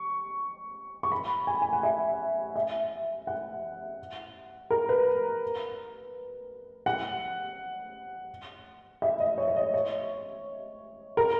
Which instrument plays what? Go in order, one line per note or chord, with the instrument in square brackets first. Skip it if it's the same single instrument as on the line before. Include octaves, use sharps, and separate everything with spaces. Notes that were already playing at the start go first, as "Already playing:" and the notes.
Already playing: [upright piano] C#6
C#6
B5
G#5
G#5
F#5
E5
E5
F#5
A#4
B4
F#5
E5
D#5
C#5
C#5
D#5
C#5
A#4